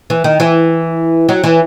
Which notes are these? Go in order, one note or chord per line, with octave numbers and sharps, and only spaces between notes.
E3
D#3
E3
F#3
E3